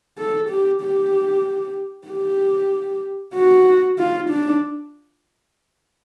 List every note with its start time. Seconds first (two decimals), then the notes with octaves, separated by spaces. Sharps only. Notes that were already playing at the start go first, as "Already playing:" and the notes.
0.18 A4
0.49 G4
0.82 G4
2.08 G4
3.34 F#4
3.98 F4
4.30 D4